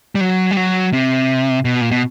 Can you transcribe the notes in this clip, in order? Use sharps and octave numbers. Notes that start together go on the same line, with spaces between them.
G3
F#3
G3
F#3
C3
B2
A#2
B2